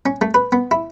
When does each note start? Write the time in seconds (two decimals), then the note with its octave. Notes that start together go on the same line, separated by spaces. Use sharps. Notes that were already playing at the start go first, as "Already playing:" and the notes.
0.06 C#4
0.21 A3
0.34 B4
0.52 B3
0.71 E4